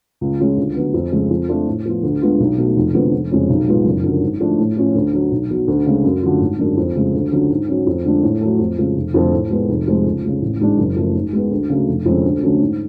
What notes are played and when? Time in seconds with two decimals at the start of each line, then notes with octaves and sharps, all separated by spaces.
0.21 C#2
0.40 C#3 G#3 C#4 F4
0.57 D2
0.76 D3 F#3 B3
0.94 F2
1.12 C#3 F3 G#3
1.30 F2
1.49 F3 A3 D4 F4
1.67 A2
1.85 F3 B3 F4
2.03 D2
2.22 D3 G#3 B3 F4
2.40 B1
2.58 B2 A3
2.76 F1
2.94 F2 D3 G#3 B3
3.13 F1
3.31 F2 C#3 G#3 C#4
3.49 B1
3.68 A2 G#3 B3 F4
3.85 F#1
4.04 F#2 D3 F3
4.22 G#2
4.40 F3 A3 D4
4.59 A2
4.77 F3 A3 C#4 F4
4.95 D2
5.13 D3 F#3
5.32 B1
5.50 B2 F#3
5.68 D2
5.86 C#3 G#3
6.04 F#2
6.23 D3 F#3 A3 F4
6.41 G#1
6.59 F#2 D3 G#3 D4
6.77 F2
6.96 C#3 G#3
7.14 D2
7.32 D3 F#3 C#4 F4
7.50 G#2
7.68 F#3 C#4
7.87 F2
8.05 D3 G#3 D4 F4
8.23 A2
8.41 F#3 A3
8.59 F2
8.78 C#3 F3 G#3
8.96 F1
9.14 F2 D3 F3 A3
9.33 A2
9.51 G#3 B3
9.69 F1
9.87 F2 F3 G#3
10.06 C#2
10.24 C#3 G#3
10.42 A1
10.60 G#2 G#3 D4
10.78 F#1
10.96 F#2 F3 A3
11.15 G#2
11.33 G#3 B3
11.51 D2
11.70 C#3 F#3 A3
11.88 F1
12.06 F2 D3 G#3 C#4
12.24 D2
12.42 D3 F#3 A3 C#4
12.61 G#2